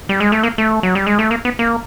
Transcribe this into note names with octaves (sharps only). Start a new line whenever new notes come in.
G3
G#3
A3
A#3
A3
F#3
G3
G#3
A3
A#3
B3
A#3